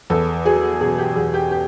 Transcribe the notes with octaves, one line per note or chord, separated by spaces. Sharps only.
E2 A4
F#3 G#4
B2 G#4
G4
E2 G#4
G4
G4